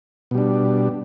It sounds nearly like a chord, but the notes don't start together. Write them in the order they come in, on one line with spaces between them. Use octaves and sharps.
B2 G3 D4